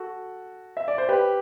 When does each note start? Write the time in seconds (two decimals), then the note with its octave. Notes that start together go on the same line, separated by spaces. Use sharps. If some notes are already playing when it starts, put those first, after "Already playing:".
Already playing: F#4 A4
0.77 E5
0.88 D5
0.98 C5
1.09 G4 B4